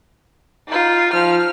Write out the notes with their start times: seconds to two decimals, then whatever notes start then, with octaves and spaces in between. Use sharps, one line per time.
0.68 D#4 F4
1.13 F3 F6